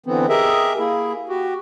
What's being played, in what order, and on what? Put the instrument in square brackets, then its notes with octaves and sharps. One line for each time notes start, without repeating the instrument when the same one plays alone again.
[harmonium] D3 E3 B3 C4
G4 G#4 A#4 D#5 E5
A#3 E4 G#4
F#4 G4